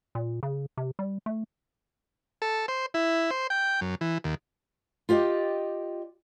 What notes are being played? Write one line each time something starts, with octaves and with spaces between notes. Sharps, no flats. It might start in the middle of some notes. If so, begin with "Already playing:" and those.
A#2
C#3
C3
G3
A3
A4
C5
E4
C5
G5
F#2
E3
D#2
F4 G4 D5 D#5 G5